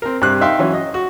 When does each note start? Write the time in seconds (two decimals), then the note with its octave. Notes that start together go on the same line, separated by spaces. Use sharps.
0.02 C4 A#4
0.22 G2 C3 C5 D6 F#6
0.41 D#4 E5 F5 G5 C6
0.59 E3 F#3 C#4
0.73 D#5
0.94 F#4